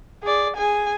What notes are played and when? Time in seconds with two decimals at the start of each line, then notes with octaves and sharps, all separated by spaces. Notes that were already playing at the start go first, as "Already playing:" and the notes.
0.23 G#4 D5
0.57 G#4 G#5